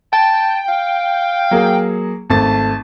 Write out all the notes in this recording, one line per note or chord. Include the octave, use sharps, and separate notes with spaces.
G5 A5
F5
F#3 A#3 G#4
G#1 A3 A5 A6